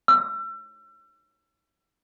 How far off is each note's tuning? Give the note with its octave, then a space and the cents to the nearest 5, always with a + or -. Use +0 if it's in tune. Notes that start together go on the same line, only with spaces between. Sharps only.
E6 +35